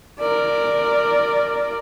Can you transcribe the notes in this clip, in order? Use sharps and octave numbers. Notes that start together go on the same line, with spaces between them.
A#4 D5